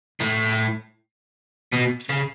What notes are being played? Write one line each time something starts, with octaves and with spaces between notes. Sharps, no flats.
A2
B2
C#3